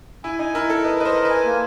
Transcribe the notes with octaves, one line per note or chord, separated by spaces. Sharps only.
E4 G#5
D#4 G#5
E4 A#4
A4 A#4
B4 D#5
B4 D#5
C5
A#4
B4
G#5
A#3